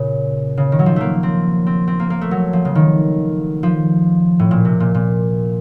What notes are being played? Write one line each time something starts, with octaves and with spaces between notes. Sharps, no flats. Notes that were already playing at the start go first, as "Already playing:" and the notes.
Already playing: A#2 C#3
C#3
D#3
F#3
F3
A3 A#3
C4
C4
C4
A#3
A#3
A3
F#3
F3
C#3
D#3
F3
A2
A#2
C3
A#2
A#2